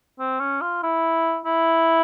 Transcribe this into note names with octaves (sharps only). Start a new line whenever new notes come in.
C4
C#4
F4
E4
E4